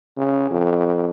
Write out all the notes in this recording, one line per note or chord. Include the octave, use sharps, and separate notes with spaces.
C#3
F2